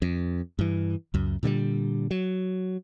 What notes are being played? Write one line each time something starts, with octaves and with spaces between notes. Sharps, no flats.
F2
G2 E3
C#2 F#2
A#2 D3 F#3 G3
F#3